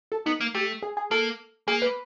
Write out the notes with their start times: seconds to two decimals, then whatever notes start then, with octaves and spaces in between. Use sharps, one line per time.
0.12 A4
0.26 B3 D#4
0.41 A#3
0.55 A3 G4
0.82 G#4
0.97 G#4
1.11 A#3 A4
1.68 A#3 G#4
1.82 B4